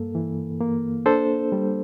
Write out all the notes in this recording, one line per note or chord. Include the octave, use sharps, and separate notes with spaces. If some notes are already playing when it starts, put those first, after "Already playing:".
Already playing: G2 A#3 A4
E3
A#3
D4 A4 C5
G3